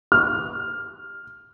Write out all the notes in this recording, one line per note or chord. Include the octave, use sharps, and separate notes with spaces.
F6